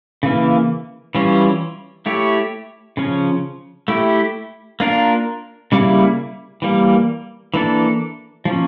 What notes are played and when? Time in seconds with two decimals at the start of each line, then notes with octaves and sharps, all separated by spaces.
0.23 C#3 E3 A#3
1.15 E3 G3 C#4 F4 C#5
2.06 A3 E4 G4 C#5
2.97 C#3 F3 C#4
3.88 A3 E4 G4
4.80 A#3 D4 F4 A#4
5.72 C#3 G3 A#3 E4
6.62 E3 G3 A#3
7.54 E3 A#3 D4 A4
8.45 F3 A#3 C#4